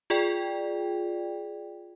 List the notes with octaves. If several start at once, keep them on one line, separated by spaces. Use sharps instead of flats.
F4 G#4 D5 G5